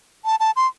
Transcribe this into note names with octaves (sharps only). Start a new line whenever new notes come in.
A5
A5
C6